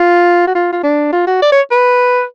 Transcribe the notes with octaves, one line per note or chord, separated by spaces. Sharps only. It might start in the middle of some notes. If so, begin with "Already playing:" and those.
Already playing: F4
F#4
F4
F4
D4
F4
F#4
D5
C#5
B4